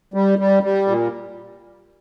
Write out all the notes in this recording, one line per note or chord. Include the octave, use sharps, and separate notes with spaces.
G3
G3
G3
A#2